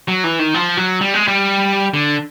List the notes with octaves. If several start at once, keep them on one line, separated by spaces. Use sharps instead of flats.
F#3
E3
D#3
F3
F#3
G3
G#3
G3
D3